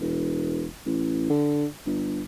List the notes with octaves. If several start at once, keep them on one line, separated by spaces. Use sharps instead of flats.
E1
A1
D3
G1